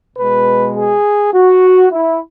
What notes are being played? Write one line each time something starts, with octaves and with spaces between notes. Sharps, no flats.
B2 G#3 B4
G#4
F#4
E4